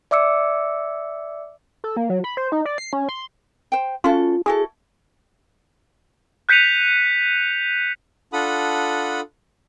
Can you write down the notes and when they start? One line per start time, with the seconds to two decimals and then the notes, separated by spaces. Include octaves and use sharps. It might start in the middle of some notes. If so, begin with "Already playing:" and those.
0.11 D5 E5 D6 E6 C#7
1.84 A4
1.97 A#3
2.10 F#3
2.24 B5
2.37 C5
2.52 D#4
2.66 D5
2.78 C7
2.93 C#4
3.09 C6
3.72 C5 G5
4.04 C#4 F4 F#4 A4
4.46 E4 F#4 G#4 A4
6.49 F#6 G6 B6 C#7 D#7 F7
8.33 D4 F4 A4 F#5 B5 D#6